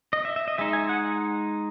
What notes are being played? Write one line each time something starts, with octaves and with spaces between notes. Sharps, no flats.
D#5
E5
E5
D#5
G#3 D#4 E5
G#5
F#5